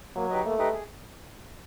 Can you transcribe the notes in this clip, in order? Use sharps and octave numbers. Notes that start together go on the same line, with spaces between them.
F#3 A#3
D#4 G4 B4 D#5
A3 A#3
D#4 G4 B4 D#5
G#4